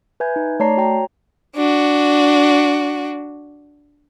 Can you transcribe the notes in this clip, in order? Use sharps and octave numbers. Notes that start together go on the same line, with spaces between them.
B4 E5 G#5 G6 G#6
D#4
A3 C#5 D5 A5 A#5 C7
F#4 C#5 G5 A#5
D4 F#4